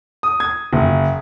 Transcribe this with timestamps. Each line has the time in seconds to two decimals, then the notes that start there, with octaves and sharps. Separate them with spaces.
0.23 D#6
0.40 G#6
0.73 F#1